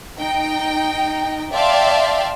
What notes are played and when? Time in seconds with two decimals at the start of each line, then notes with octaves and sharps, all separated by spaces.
0.19 D#4 G5
1.52 D5 E5 F5 G5 A5 C6